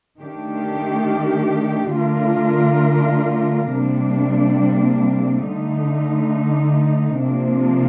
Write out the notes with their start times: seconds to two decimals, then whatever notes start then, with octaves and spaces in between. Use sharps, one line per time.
0.19 D#3 A3 D4 G4
1.95 D3 A3 D4 F4 A#4
3.71 C3 G3 A#3 D4
5.46 D3 A3 D#4
7.21 C3 F3 A#3 D4